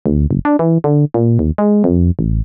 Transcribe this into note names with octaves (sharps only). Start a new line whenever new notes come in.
D2
F#1
D4
E3
D3
A#2
D#2
G#3
F2
A1